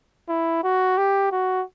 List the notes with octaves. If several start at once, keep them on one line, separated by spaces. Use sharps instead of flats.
E4
F#4
G4
F#4